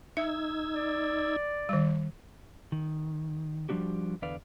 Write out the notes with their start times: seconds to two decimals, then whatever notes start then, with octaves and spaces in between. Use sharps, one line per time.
0.17 D#4 E5 E6 G#6
0.75 D5
1.69 D#3 G3
2.72 D#3
3.69 F3 G3 D4 F#4 G4
4.22 E2 D3 B4 D5 F5